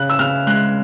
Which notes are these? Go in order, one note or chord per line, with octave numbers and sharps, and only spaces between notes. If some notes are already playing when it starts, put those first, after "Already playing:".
Already playing: C#3 F#6
E6
C#3 F6
G#3 F#6